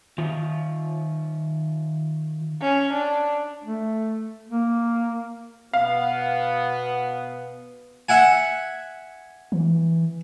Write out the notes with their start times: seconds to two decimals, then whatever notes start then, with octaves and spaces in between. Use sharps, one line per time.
0.18 D#3 F4
2.61 C#4
2.93 D4
3.64 A3
4.49 A#3
5.73 B2 B3 F5
8.09 E5 F#5 G#5
9.52 E3